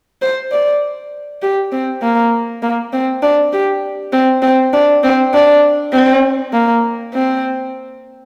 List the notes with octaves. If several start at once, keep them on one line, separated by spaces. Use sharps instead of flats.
C5
D5
G4
C4
A#3
A#3
C4
D4
G4
C4
C4
D4
C4
D4
C4
A#3
C4